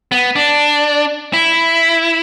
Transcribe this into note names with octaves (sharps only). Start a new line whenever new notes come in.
B3
D4
E4